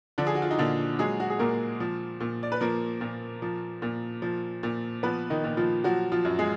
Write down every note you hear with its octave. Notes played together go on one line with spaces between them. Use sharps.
D3 F3 D4
G#4
F#4
F4
D#4
A#2 D3 D4
F#3 G#3 G#4
F#4
G#4
A#2 A#3 A#4
F3
A#2
D5
B4
F3 A#3 A#4
A#2
F3
A#2
F3
A#2
F3 B3 B4
D#3 D#4
A#2
F3 F4
F3 F#3 F#4
F3 F4
F#2
G#3 G#4